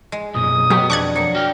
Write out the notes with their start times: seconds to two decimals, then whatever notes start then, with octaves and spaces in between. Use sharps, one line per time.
0.12 G#3
0.35 B1 F#2 A#2 D#6
0.70 B2 F#3 B3 G4
0.90 F2 D4 F4 G4 C#6 F#6 G#6
1.16 F#3 A#3 C#7
1.35 F#4 G5 F6